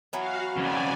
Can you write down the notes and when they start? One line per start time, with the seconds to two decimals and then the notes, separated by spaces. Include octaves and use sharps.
0.13 E3 F#3 B3 F#4 F5
0.57 F2 C#3 D5 G#5